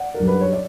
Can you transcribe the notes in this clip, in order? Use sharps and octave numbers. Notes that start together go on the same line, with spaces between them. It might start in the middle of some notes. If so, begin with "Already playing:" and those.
Already playing: D5 F#5
A#4
F#2 D3 G3
B4
C#5
D5